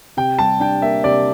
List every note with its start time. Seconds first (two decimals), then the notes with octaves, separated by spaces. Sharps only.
0.17 C3 G5
0.39 G3 A5
0.60 D4 G5
0.82 A#3 E5
1.04 C3 D5